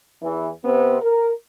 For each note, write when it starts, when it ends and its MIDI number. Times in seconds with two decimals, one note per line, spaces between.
0.23 0.49 40
0.23 0.49 52
0.65 0.97 48
0.65 0.97 59
0.65 0.97 60
1.01 1.31 70